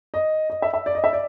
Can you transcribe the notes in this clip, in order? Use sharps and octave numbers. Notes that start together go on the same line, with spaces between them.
D#5
D#5
E5
E5
D5
D#5
E5
D5